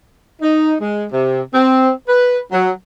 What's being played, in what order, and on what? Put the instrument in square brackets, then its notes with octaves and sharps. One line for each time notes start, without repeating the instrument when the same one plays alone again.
[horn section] D#4
G#3
C3
C4
B4
F#3